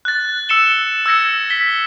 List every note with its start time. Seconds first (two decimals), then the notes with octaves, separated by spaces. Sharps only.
0.05 F#6 A6
0.49 E6 C#7 E7 G7
1.06 E6 G#6 A#6 C#7
1.50 B6 G7